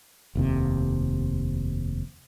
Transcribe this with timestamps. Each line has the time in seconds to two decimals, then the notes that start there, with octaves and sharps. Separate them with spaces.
0.35 F1 D#2 C3